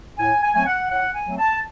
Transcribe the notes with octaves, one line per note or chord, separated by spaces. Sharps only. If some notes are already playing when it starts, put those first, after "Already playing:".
A2 G#5
G#5
F#3 A3 C4 G#5
F#5
A2 F#5
G#5
F#3 A3 C4
A5